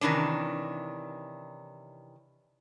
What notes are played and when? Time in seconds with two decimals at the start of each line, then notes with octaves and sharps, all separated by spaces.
0.01 C3 D#3 E3 C#4 D4